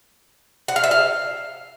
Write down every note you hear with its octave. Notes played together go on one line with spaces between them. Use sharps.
F#5
F5
E5
F5